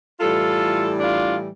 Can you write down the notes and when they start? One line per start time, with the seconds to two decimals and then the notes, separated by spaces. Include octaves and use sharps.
0.20 A2 E3 G3 F4 A4
1.00 D4 F4